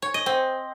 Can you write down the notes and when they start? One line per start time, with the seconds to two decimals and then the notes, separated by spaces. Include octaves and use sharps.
0.02 C#5
0.14 D#5
0.26 C4